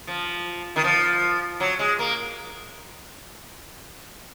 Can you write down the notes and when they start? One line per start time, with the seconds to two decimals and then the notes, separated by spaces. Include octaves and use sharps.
0.07 F3
0.76 D#3
0.84 F3
1.60 F#3
1.79 G#3
1.99 A#3